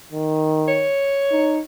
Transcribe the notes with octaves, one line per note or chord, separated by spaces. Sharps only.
D#3
C#5
D#4